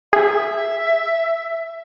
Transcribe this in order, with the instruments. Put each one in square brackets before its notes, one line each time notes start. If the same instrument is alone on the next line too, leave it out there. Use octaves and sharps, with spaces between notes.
[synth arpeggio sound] G#4 [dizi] E5